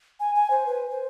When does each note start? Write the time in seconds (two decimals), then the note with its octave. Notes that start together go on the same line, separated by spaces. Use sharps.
0.20 G#5
0.35 G#5
0.50 C5
0.66 B4
0.90 C5